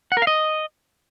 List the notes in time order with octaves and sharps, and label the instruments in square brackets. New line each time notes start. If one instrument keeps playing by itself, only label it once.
[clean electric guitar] F#5
A#4
F5
D#5